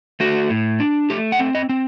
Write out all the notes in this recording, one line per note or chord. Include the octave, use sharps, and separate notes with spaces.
A3 F#4
A2
D4
A3 G4
F#5
C4
D#5
C4